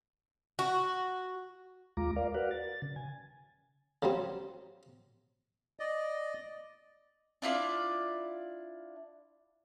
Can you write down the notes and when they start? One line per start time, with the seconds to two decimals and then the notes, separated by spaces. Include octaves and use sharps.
0.59 F#4
1.97 D#2 G#3 F4 A#5 D6
2.16 A#4 D5 F5
2.34 F#4 A#4 B4 D5 F5 F#5
2.51 A6
2.82 C#3
2.96 G#5
4.02 C#3 F#3 G3 C4
5.80 D5 D#5
7.42 D4 E4 F4 D5